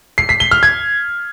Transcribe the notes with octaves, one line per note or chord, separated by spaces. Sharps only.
C7
B6
G7
F6
G#6